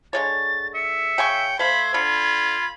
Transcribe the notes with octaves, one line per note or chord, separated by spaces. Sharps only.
D3 G#3 C#5 A6
E5 C#7
C#3 G5 G#5 C#6
A3 C5 F5 B5 G#6
D3 F4 B5